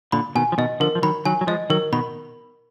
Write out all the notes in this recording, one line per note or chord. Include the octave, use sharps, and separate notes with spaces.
A#2 D3 B5
B2 D#3 G#5
F3
B2 D#3 D#5
D3 F3 A#4
F3
D#3 F#3 B5
D#3 F#3 G#5
F#3
F3 G#3 D#5
D#3 F#3 A#4
B2 D#3 B5